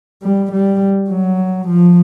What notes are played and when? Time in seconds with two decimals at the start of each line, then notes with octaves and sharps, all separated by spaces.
0.23 G3
0.53 G3
1.10 F#3
1.68 F3